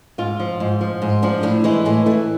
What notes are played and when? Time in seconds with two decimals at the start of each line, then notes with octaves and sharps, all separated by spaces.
0.18 G#2 F4
0.40 F3
0.60 G#2
0.81 F3
1.02 G#2
1.22 F3 D4
1.43 A2 D4
1.64 E3 G#3
1.85 A2 G#3
2.06 E3 A3